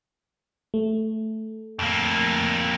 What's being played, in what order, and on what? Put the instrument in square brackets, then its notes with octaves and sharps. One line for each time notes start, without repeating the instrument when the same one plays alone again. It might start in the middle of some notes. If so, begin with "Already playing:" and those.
[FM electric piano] A3
[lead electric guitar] F2 A#3